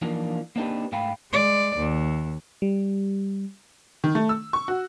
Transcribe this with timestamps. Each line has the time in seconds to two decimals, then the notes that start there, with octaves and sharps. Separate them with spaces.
0.02 E3 F3 A#3 D4 D#4 F4
0.56 A#3 C4 D4 D#4 G4 B4
0.92 G#2 A3 F5 G5 B5
1.32 G#3 D5
1.77 D#2
2.62 G3
4.04 D#3
4.15 A3
4.29 E6
4.53 C#6
4.68 F#4